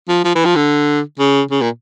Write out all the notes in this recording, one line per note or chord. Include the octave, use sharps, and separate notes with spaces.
F3
F3
E3
F3
D3
C#3
C#3
A#2